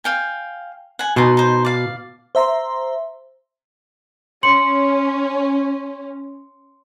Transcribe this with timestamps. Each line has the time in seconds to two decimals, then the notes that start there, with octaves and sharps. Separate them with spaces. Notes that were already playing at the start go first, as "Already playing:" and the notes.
0.04 F5 G5 G#5
0.99 F#5 G#5
1.16 B2 D#4 F#5 C6
1.37 D#4 C5
1.65 D5 F5
2.35 C5 E5 A#5 C6
4.43 C#4 C6 C#7 F#7